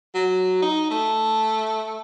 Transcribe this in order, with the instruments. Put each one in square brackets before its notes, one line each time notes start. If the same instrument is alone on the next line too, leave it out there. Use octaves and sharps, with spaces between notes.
[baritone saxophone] F#3
D#4
A3